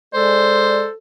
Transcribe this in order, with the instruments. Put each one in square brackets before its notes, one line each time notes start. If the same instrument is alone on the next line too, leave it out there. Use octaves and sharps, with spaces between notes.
[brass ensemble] G#3 D5 [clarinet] A4 [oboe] C5